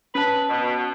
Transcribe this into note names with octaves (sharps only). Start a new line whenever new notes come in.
C#4 B4 A5
B2